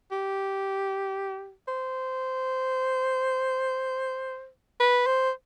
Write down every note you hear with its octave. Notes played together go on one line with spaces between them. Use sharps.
G4
C5
B4
C5